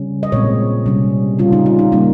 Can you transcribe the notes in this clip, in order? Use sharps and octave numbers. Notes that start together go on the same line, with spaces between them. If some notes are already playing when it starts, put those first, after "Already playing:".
Already playing: C#3 G3 C#4
D#5
A#2 G#3 C4 C#5
C3 G3 C#4
C#3 G3 C#4 F4
D#4
F4
D#4
C#3 G3 A#3 C#4 D#4